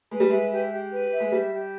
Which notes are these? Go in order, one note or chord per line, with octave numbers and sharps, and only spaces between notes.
G#3 B4
G3
G#3 E5
G4
G4
B4
E5
G#3
G3 G4
G4